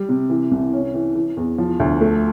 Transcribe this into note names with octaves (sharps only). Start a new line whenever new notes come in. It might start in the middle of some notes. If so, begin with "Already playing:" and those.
Already playing: G3
C3
E3
C2
C#4
E3
E3
E2
F3
D2
A3